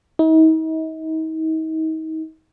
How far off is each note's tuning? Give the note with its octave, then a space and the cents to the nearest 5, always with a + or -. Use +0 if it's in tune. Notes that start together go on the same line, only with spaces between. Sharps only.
D#4 +40